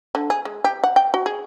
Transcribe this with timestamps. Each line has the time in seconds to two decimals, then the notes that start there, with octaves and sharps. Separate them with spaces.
0.15 D3
0.30 G#4
0.45 G#3
0.64 G4
0.84 F#5
0.96 G5
1.14 F#4
1.26 G#4